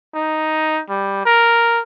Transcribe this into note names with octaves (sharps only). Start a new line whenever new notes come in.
D#4
G3
A#4